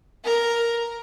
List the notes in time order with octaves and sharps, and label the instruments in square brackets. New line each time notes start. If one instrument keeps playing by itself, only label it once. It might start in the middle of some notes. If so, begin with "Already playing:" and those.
[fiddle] A#4